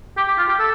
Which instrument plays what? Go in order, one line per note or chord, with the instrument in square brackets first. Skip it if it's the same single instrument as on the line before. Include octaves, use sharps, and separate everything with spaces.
[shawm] G4
G4
F4
G4
A4